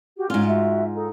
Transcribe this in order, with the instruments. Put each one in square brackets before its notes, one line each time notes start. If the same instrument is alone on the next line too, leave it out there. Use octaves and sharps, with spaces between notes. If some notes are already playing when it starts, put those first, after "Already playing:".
[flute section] F#4 G4
[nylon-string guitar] G#2 F4 [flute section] C#4 F6
[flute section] F#4 E5
D#4 A4